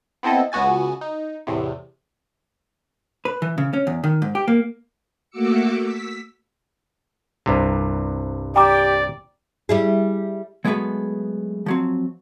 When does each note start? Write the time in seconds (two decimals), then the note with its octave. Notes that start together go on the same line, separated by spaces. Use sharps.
0.23 B3 C4 E4 A4 D#5
0.52 C#2 B3 F#4 G#5 A6
1.01 D#4
1.47 E2 A2 C3
3.25 B4
3.42 E3
3.58 C#3
3.73 C#4
3.87 E2
4.04 D#3
4.22 G#2
4.35 G4
4.48 A#3
5.30 A3 A#3 F#4 D6 E6 C#7
5.82 E6 B6
7.46 C2 G2 C3
8.56 G4 D5 G5 A#5 D6
9.69 G3 E4 G#4
10.65 F#3 G#3 A3 B3 G#4 B4
11.66 F3 F#3 C4